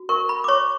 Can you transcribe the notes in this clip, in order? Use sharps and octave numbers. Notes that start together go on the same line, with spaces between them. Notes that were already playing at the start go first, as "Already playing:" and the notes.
Already playing: F#4
A#4 C#6
B5
D6
C#5 C#6